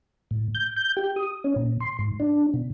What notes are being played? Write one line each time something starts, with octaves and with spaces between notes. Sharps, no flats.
A2
G6
G6
G4
D#6
C#4
A#2
C6
G#2
D4
B2